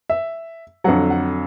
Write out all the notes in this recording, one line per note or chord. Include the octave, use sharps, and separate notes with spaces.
E5
F2 D3 F#3 F#5
F#5